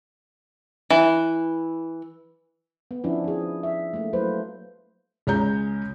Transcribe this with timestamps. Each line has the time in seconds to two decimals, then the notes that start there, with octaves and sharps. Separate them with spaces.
0.90 E3
2.91 B3
3.04 F3 C#4 D4 E4
3.24 F3 G#4
3.63 E5
3.93 A3 A#3
4.13 F#3 A3 A#3 E4 B4 C5
5.27 C#2 G#3 C#5 A#5 G6